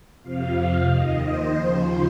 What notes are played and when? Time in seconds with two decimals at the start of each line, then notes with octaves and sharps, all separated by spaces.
0.22 F2 C3 F3 F5
0.89 D#2 D#3 D#5
1.22 C5
1.55 D#2 C#3 F3